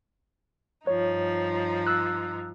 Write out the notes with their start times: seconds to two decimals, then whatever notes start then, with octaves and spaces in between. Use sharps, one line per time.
0.87 G2 F3 D#4 C#5
1.87 E6 F#6